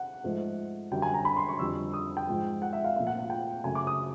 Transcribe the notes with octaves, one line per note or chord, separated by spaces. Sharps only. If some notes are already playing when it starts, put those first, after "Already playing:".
Already playing: F#5
G#2 F3 A3
F#2 D3 G3 G5
G#5
A#5
B5
C6
C#6
F2 D3 G3 E6
D#6
G5
G#2 F3 G#3
F#5
E5
F5
A#2 F3 A3 F5
F#5
F#5
G5
F#2 C#3 F#3 A3 G#5
D6
D#6